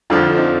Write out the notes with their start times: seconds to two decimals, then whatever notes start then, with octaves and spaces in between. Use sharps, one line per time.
0.10 F2 D3 F3 D4 F4
0.28 F4
0.36 C4 D#4